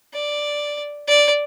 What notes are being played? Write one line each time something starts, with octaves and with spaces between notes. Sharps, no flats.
D5
D5